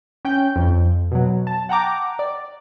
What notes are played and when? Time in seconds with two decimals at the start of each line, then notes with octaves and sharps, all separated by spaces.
0.25 C#4 G5 G6
0.56 F2
1.11 B2 F#3
1.47 A5
1.69 F#5 G5 A#5 D6
2.19 D5